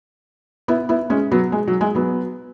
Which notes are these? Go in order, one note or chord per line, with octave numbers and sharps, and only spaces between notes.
B3 E4
B3 E4
G#3 C#4
F#3 B3
G#3
F#3
G#3
F#3 B3